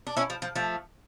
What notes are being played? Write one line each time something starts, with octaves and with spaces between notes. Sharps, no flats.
D4
C#4 E4
F3
F3
F3 A3